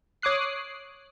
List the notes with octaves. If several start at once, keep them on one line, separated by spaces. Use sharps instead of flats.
C#5 D6 D#6 F#6 C7